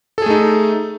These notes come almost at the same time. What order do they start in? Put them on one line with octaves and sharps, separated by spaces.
A4 G#4 A3 D#4